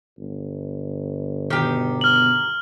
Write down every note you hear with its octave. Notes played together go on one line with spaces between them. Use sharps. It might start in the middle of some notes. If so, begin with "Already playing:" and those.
G1
B2 D#3 G4
F6 F#7